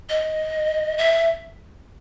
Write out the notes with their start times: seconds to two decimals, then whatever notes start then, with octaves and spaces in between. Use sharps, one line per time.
0.09 D#5
0.98 E5